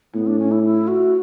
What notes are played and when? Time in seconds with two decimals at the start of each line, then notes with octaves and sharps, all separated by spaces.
0.14 A2 B3
0.27 D4
0.39 C#4
0.51 E4
0.63 E4
0.88 F#4